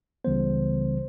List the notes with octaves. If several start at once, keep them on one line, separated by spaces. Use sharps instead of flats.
C#2 C#3 E3 G3 B3 C5